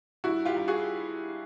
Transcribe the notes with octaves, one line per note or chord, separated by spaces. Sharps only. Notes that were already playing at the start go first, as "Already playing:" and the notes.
G2 E4 F#4
F4 G4
G2
F#4 G#4